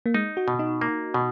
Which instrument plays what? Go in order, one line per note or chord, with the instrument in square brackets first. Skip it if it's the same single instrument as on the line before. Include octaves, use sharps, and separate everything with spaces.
[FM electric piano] A#3
[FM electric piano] G#3 [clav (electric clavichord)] D#4
[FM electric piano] F#4
[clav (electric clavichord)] B2
[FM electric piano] D#4
[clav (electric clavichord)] A#3
B2